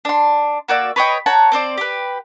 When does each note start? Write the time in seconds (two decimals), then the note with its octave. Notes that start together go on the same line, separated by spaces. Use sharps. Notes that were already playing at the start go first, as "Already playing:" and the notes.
0.05 D4 C6
0.68 A#3 F#4 D5 E6
0.96 B4 C#5 D#5 G5
1.26 C#5 F#5 A5 A#5
1.52 C4 C5 D5
1.78 G4 B4